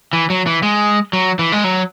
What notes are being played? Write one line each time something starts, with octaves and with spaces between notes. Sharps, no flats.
E3
F#3
E3
G#3
F#3
E3
G#3
F#3